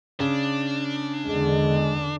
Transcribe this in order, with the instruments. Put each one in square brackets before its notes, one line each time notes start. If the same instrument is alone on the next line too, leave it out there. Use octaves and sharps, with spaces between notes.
[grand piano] C#3 [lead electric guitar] D4
[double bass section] E2 D3 [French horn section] G#3